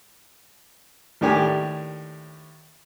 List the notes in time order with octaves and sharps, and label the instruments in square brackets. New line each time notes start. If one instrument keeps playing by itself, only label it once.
[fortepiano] D#2 A2 D4 G4 A#4 G#5